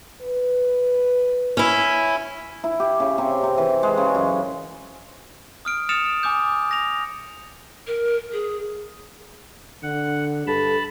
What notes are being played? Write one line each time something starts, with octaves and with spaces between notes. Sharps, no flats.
B4
C#4 E4
E4
G4
C#3
C3
C3
E3
G#3
C#3
F#2
D#6 F6 D7
D#6 F6 A6 C#7 E7 F7
G#5 D6 D#6 G6
A#6 F7
A#4
G#4
D3 F#5
G2 A4 A5 B5